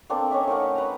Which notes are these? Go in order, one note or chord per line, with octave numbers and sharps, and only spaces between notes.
A#3 C4 D4 A4
C#4 C#5 D#5 E5
A3 D#4 A#4 F#5
B4 A#5